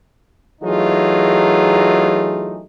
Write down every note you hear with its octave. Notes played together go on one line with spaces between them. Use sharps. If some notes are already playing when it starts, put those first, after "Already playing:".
E3 F#3 A3 D#4 F4 G#4